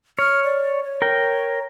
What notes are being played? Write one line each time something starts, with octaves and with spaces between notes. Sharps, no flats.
C#5 F6
D5
C#5
A#4 G5